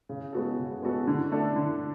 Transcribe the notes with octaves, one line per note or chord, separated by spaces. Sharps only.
C#3
G#3 B3 F#4 A4
C#3
G#3 B3 F#4 A4
D3
A3 D4 A4
D3